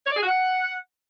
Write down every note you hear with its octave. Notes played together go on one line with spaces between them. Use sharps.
C#5
D5
G#4
F#4
F#5